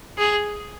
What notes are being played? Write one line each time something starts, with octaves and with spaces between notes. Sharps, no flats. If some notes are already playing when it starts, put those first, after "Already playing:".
G#4